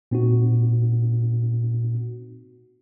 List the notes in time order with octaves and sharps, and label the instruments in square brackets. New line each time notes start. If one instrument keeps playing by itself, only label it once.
[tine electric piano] A#2 C4 D#4 F#4